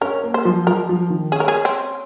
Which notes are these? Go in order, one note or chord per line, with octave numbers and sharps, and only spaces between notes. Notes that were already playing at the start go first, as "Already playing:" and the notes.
C#4 A#4
A#3
C5
F3
F3 A#4
F3
D#3
C#4 G#4
A#4
G#4
C4